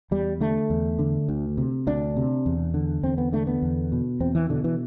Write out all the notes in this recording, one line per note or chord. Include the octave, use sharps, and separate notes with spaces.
E2 G3
D3 A3
E2
D3
D2
C3
D2 D4
C3
E2
D3
E2 C4
B3
D3 A3
B3
E2
B2
E2 C4
E3
B2 D3
E3